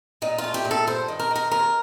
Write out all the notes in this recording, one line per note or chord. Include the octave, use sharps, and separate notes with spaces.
A#2 D#4
F4
A3
G4
A#2
A4
G2 C5
D#3
A#4
D#3 A#4
D#2 A#4